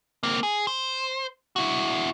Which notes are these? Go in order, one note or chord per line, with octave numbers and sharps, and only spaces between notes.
A#3 C4
G#4
C5
E4 F#4